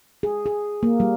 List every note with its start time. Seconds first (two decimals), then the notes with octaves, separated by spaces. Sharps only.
0.23 G#4
0.46 G#4
0.83 A#3
1.00 G3